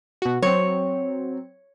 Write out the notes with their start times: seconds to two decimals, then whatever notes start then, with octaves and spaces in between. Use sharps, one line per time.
0.22 B2 F#4
0.42 F#3 C4 C#5